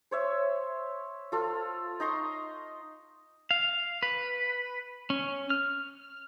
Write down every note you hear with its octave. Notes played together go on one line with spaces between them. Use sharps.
C5 C#5 E5
F4 A4 F5
D#4 A#5 C6 C#6
F5
B4
C#4
F6